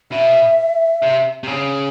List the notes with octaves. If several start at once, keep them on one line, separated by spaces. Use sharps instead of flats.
B2 E5
C3
C3
C#3